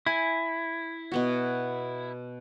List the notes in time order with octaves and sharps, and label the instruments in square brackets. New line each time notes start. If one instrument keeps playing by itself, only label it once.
[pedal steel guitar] E4 [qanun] G#5
[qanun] B2 B3 F#4